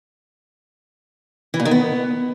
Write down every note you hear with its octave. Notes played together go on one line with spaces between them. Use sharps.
E3
A#2
D#3
B3